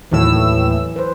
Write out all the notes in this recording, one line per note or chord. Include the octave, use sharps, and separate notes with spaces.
D#2 A2 E3 F#3 E6
B4 C5